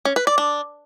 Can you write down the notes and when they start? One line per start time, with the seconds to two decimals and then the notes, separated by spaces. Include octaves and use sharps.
0.05 C#4
0.16 B4
0.27 D5
0.38 D4